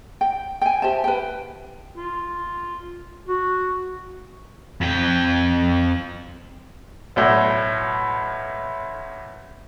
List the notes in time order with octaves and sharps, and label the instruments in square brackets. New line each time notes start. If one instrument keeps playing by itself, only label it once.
[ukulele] G5
G5 G#5
G4 C5 E5 A5
B4 G5
[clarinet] F4
F#4
[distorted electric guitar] F2 G5
[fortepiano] B1 A2